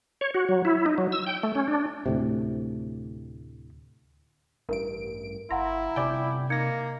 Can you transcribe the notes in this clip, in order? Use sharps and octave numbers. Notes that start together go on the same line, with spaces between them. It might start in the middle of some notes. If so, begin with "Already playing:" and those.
C#5
F#4
F#3
E4
D#4
F#3
E6
G5
A3
C#4
D4
D2 A2 C3
A1 G2 A#4 D7
G1 E4 F5 F#5 A#5 C6
G1 C3 D5 G5 G#5 B5 D6
A#3 D#4 G#6 A#6 C#7